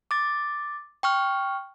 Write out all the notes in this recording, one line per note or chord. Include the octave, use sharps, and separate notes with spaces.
D6 A6
G5 C#6 F6